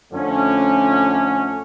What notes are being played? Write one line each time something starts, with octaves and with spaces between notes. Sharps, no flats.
F2 D3 A3 C#4